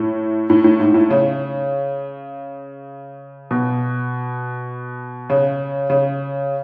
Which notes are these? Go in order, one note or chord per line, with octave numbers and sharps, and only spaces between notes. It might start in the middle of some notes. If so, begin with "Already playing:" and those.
Already playing: A2
A2
A2
G#2
A2
C#3
B2
C#3
C#3